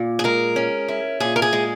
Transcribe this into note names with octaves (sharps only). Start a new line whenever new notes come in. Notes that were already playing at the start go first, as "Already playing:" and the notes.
Already playing: A#2
G#4
G#3 A#4
C#4
E4
A#2 G#4
A#4
G#4
G#3